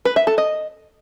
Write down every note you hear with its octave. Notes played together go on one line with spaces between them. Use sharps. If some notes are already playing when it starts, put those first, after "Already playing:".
B4
E5
A4
D#5